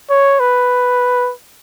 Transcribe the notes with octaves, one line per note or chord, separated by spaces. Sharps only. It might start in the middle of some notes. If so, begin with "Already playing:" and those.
C#5
B4